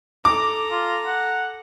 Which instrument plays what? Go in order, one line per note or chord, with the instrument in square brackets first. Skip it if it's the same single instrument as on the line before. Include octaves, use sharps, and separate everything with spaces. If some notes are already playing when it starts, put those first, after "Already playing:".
[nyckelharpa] A4 A#5 [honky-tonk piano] D6
[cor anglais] F4
F#5